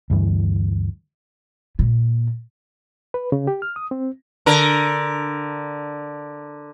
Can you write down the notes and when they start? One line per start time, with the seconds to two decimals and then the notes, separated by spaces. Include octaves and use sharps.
0.10 D2 G2 E3
1.79 A#2
3.14 B4
3.32 C#3
3.47 G4
3.62 F6
3.76 D#6
3.91 C4
4.46 D3 A#4